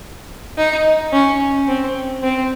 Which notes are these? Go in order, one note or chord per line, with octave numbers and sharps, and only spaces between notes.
D#4
C#4
C4
C4